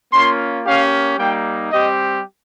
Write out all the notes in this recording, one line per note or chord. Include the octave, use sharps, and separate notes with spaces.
A#3 C#4 F4 C6
A#3 C#4 G4 F5
G3 A#3 D#4 G5
G3 C4 G4 D#5